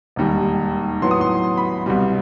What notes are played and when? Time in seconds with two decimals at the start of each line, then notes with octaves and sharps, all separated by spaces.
0.16 E1 D#2 D#3 G3
1.02 A2 F#3 B3 C6
1.11 D#6
1.21 C6
1.57 B5
1.86 C2 B2 G3